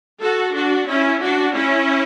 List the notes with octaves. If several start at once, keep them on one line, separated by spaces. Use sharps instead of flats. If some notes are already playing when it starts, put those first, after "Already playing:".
F#4 A4
D4 F#4
C#4 E4
D4 F#4
C#4 E4